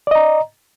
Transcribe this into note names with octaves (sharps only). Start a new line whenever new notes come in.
D5 D#5 A#5